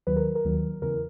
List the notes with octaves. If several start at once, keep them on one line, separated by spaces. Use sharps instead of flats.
D#2 D#3 F#3 B4
A#4
A#4
D#2 D#3 F#3
E2 C#3 E3 A#4